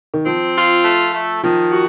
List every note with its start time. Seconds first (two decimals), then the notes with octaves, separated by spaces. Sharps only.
0.14 D#3
0.26 F3 C4
0.56 F4
0.85 A3
1.13 A3
1.43 D#3 F3
1.72 F#4